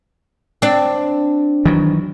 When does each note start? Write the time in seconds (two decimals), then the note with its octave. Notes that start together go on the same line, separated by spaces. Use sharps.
0.62 C4 D4
1.65 D#3 E3 F#3